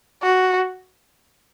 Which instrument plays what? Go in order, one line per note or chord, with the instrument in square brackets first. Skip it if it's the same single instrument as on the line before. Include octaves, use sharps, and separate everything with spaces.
[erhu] F#4